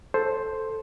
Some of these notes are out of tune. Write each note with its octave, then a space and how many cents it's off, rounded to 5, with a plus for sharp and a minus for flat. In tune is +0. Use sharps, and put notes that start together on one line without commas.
A4 +0 C5 +5